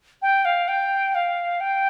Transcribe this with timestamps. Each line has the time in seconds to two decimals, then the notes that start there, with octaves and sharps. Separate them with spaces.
0.22 G5
0.45 F5
0.68 G5
1.15 F5
1.60 G5